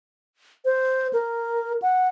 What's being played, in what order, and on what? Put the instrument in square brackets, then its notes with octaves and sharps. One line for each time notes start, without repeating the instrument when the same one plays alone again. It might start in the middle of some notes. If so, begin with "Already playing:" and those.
[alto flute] C5
A#4
F#5